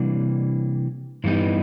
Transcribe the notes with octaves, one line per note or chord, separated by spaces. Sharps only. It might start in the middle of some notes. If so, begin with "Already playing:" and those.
Already playing: C3 E3 G3 A#3 D4
G2 E3 G3 B3 D#4